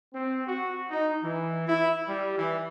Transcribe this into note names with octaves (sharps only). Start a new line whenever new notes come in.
C4
F#4
D#4
E3
E4
G3
E3